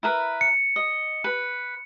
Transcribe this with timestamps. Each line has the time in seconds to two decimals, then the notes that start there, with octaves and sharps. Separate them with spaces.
0.03 E4 A#4 B4
0.41 C#7
0.76 D#5
1.24 B4